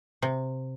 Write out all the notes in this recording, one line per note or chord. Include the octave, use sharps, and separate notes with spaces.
C3